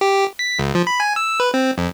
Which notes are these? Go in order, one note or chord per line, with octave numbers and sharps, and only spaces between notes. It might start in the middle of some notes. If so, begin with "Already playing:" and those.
G4
B6
C#2
F3
B5
G#5
E6
B4
C4
F2